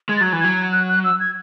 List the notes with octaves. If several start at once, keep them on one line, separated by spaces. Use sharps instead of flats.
G#3 G#6
A6
F#3 G#6
E3
F#3 G#6
F#6
F#6
E6
G#6